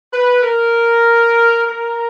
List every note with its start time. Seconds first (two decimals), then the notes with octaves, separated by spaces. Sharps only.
0.12 B4
0.43 A#4
1.67 A#4